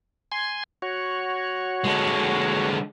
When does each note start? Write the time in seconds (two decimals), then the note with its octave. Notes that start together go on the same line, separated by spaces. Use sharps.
0.32 G#5 C6
0.82 F#4 C#5
1.85 D3 G#3